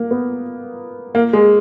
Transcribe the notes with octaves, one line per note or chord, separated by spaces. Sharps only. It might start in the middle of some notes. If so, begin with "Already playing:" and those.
Already playing: A#3
B3
A#3
G#3